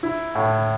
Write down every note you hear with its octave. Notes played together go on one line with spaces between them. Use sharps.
E4
A2